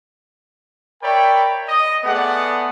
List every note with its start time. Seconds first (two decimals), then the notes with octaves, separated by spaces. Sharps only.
1.02 A#4 C#5 D5 E5 G5 B5
1.67 D#5
2.05 A3 B3 G#4 D5 F#5